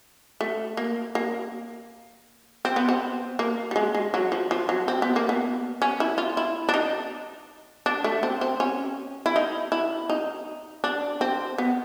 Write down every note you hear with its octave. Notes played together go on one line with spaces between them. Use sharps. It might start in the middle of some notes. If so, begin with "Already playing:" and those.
A3
A#3
A#3
C4
B3
C4
A#3
G3
G#3
G#3
F#3
F3
F3
F#3
C4
B3
A#3
B3
C#4
E4
F4
E4
D4
D#4
D4
A3
C4
C4
C#4
E4
D#4
E4
D#4
D4
C4
B3